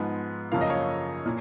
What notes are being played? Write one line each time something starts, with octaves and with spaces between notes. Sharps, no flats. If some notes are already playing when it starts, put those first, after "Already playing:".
Already playing: G#2 F3 G#3 B3
F#2 C#3 F3 A#3 F5
D#5
C#5 F5
A#2